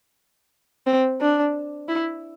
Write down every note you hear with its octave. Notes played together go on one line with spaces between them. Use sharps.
C4
D4
E4